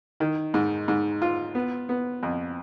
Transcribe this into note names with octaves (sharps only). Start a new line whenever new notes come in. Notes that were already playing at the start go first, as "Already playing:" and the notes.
D#3
G#2
G#2
F4
B3
B3
F2